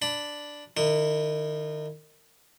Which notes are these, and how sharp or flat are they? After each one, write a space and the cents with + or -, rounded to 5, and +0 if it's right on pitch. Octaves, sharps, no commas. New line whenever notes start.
D4 +0 B5 +0
D#3 -30 E4 +0